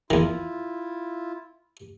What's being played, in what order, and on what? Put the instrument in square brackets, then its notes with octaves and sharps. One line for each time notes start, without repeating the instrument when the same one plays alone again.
[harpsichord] E2 D#3 [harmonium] E4 F4